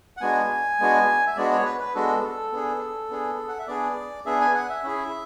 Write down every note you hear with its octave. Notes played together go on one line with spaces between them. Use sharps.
F#5
G#3 B3 D4 F#4 G#5
G#3 B3 D4 F#4
E5
G#3 B3 D4 F#4 D5
C#5
B4
B4
G#3 B3 D4 F#4 A4
A4
B3 D4 G#4
B3 D4 G#4
F#5
E5
B3 D4 G#4 D5
B3 D4 G#4 E5
G#5
F#5
E5
C#4 E4 G#4